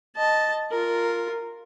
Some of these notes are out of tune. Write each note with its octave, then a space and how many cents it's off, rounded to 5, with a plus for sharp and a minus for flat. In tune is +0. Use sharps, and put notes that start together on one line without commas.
D#5 +0 A5 -5
F4 +0 A#4 -10